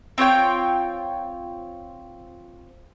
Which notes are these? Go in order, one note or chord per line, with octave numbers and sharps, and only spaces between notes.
C4 F4 C#5 G5